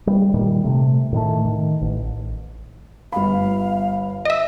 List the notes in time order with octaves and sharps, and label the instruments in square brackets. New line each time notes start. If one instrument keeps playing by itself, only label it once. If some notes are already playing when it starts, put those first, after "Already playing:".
[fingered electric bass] G3
A#2 D#3 G3
C3 A3
A2 D#3 G#3 A3
D#3
A1
[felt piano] G1 B5 [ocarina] F5
[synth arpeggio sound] D#5 E5